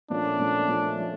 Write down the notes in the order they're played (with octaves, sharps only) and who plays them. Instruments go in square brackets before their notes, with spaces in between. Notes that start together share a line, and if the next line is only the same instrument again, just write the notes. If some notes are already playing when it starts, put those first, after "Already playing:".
[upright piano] A#2 F3 A3 C#4 [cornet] D4
[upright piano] A#2 F3 A3 C#4
A#2 F3 A3 C#4
F3 A3 C#4